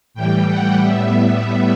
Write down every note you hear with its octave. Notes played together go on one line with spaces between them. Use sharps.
A2 E3 G3 G5
F#5
A2 G3 B3 E5